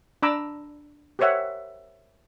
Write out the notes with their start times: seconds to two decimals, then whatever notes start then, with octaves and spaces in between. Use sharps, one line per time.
0.22 D4 A#5 B5 D6 E6
1.19 G4 A#4 C5 C#5 E5 F#5